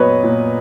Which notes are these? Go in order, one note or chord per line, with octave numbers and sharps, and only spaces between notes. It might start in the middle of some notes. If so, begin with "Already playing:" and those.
Already playing: A#2 F#3 B3 B4 C#5 D#5
A#2